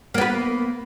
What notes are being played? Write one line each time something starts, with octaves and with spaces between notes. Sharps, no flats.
A#3 B3 B4